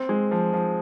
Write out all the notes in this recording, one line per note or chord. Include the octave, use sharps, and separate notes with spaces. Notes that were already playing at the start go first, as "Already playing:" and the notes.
Already playing: C4
G#3
F3
F3